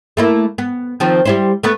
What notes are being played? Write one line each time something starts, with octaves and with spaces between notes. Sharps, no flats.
A3 A#3 E4
B3
D#3 F3 C4
G3 E4 C5
A3 B3 B4